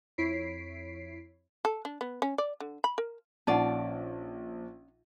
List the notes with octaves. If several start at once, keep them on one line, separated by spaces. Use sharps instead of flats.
F2 E4 C#5 B6 C7 D7
A4
D4
B3
C#4
D5
D3
B5
A#4
A#1 C#4 D#4 F4 D5 F#5 A5